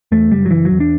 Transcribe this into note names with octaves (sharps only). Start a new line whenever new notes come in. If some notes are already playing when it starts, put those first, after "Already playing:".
E2 A3
F#1 G3
F#3
F#1 E3
F#3
E2
D4